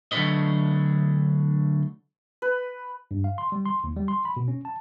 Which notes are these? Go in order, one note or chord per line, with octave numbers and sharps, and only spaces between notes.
D3 F#3 A3 D4 B4 D#5
B4
G2
F5
C6
G3
C6
D#2
G3
C6
B5
B2
C#4
A5